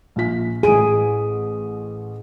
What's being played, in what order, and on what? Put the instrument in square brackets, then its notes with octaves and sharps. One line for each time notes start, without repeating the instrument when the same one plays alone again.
[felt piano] A#1 F4 B6
[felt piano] A1 D7 D#7 [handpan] G#4